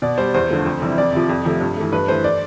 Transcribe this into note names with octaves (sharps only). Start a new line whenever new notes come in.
B2 D5
G3 C5
E2 C5
D3 F3 A3
F2
C3 E3 G3
F2 D5
C3 F3
F2
C3 F3 A3
G2
E3 A3
G2 B4
E3 A3 C5
D5